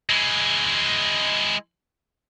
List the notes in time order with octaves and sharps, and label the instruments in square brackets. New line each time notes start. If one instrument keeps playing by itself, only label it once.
[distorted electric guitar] G#3 E4